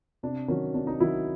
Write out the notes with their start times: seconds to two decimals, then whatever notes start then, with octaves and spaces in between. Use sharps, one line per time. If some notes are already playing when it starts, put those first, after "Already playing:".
0.23 C3 D4
0.48 D#3 F#3 C#4
0.74 C3 D4
0.87 D#4
1.00 D#3 F#3 E4